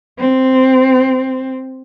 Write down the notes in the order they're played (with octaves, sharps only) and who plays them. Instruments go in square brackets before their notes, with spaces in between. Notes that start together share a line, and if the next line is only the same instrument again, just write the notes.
[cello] C4